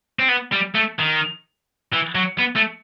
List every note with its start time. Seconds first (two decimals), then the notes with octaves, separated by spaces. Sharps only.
0.19 C4
0.29 B3
0.52 G3
0.75 A3
0.99 D#3
1.93 E3
2.15 F#3
2.39 B3
2.56 A3